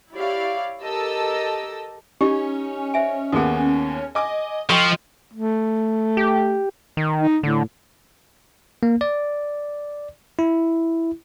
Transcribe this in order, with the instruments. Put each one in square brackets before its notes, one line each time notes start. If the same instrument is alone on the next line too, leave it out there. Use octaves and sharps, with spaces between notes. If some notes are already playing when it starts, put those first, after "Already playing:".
[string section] E4 G4 C#5 D5 F5
G4 A4 A#4 D#5 A5 E6
[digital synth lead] C#4 [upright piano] D#4 [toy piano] G4
[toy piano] C5 E5 G#5
[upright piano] D#2 A#3 B3 [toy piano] G#4 D#6
[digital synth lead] D#5 [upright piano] G#5 D6
[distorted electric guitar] F3 [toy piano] A4 G5 C6 [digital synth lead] D#5 [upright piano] C#6
[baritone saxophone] A3
[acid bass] G4
D#3
[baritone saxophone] D#4
[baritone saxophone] A2 [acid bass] D3
[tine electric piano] A#3
D5
E4